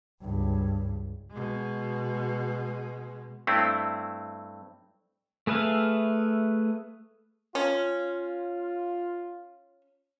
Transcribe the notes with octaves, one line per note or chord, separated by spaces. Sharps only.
C#2 G2
B2 G#3
G2 A3 C4 E4
A3 G#4 B4 E5 F5
C#4 F4